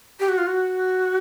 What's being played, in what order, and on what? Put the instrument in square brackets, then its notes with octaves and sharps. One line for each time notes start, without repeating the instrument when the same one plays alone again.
[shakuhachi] G4
F#4
F4
F#4